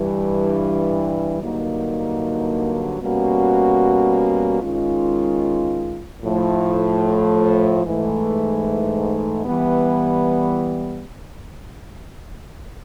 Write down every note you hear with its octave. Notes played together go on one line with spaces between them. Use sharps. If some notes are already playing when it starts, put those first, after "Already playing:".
Already playing: G2 E3 G3
G2 D3 F#3 A#3 D#4
B2 G3 A#3 C#4 F#4
D#3 G#3 C#4 F4
A2 F3 A3
G#2 E3 A3
E3 G3 B3